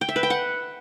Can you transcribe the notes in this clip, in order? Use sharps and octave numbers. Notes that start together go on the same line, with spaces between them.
G5
E5
B4
G5
F#5